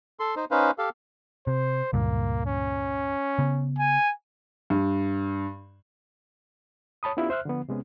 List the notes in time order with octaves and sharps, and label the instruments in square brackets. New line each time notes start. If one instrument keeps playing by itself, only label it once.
[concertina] A4 C6
D#4 C5
C#4 D#4 B4 C5 F5
G4 A4 F5
[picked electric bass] C3 [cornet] C5
[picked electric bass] C#2 G2 A#2 [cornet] A#3
[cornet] C#4
[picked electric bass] C#3 B3
[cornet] G#5
[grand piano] G2
[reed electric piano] C#5 A5 B5 D#6
B3 C#4 D4 E4 F4 G4
C5 E5 F6 F#6
D3 F3 B3
C3 G#3 B3 C#4